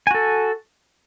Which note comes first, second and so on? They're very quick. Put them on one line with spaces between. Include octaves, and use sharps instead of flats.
G#5 F#4 A4